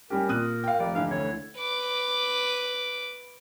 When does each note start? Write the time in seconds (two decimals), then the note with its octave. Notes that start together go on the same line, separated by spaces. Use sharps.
0.10 G3 C#4 G4 A#4
0.29 A#2 D#6 F#6 D#7
0.64 F5 G5
0.79 F1 D5
0.95 D3 E3 F5
1.11 D2 C#5
1.57 B4 D6